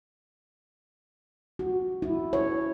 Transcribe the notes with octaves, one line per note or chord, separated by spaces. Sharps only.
F#4
E4
C#5